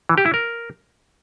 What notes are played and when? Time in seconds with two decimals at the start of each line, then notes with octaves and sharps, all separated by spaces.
0.09 E3
0.18 G4
0.26 E4
0.34 A#4